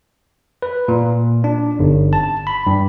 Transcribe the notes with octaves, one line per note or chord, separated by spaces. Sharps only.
B4
A#2
D4
G1
A5
B5
G2